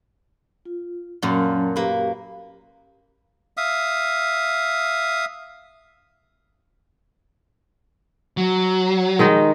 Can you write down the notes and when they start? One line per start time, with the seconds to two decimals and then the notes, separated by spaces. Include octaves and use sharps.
0.65 F4
1.22 F#2 A#2 F#3 C#4 A5
1.76 A#3 G4 B4
3.57 E5 F5 D#6
8.37 F#3
9.19 D#3 G#3 D#4